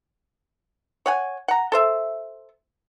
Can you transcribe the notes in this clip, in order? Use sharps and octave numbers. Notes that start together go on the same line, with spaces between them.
C#5 F#5 G#5
F#5 A#5
A4 C5 E5